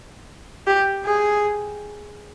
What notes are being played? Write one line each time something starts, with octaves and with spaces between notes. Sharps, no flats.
G4
G#4